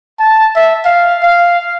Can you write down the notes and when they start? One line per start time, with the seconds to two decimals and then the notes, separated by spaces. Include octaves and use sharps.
0.20 A5
0.56 E5
0.85 F5
1.23 F5